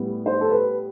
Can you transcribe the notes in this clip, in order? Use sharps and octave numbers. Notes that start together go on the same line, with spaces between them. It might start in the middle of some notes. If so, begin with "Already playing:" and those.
Already playing: A2 G3 B3
C5
A4
B4